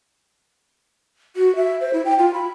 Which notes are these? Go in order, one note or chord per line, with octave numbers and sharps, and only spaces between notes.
F#4
E5
C5
E4
G5
F4
B5